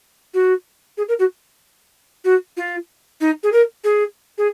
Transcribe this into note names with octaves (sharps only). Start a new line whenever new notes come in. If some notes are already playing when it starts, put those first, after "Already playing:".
F#4
G#4
A#4
F#4
F#4
F4
D#4
G#4
A#4
G#4
G#4